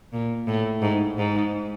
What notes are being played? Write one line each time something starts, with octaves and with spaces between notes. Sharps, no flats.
A#2
A2
G#2
G#2